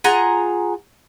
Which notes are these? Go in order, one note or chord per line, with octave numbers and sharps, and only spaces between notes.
F4 G#4 F#5 A#5